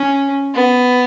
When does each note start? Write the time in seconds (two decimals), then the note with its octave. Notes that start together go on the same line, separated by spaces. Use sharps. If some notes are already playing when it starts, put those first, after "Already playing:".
Already playing: C#4
0.55 B3